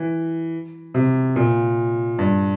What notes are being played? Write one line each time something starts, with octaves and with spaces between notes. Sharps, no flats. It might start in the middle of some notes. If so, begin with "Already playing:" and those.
Already playing: E3
C3
A#2
G2